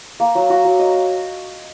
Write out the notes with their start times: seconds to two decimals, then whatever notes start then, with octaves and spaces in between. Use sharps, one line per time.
0.20 A#3
0.35 F#3
0.50 F#4
0.65 F#3
0.79 D#5